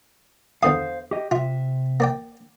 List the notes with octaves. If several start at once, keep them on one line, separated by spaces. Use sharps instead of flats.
E2 D3 C5 F5 D#6
G4 D#5
C3 F4 E5
A#3 D5 G5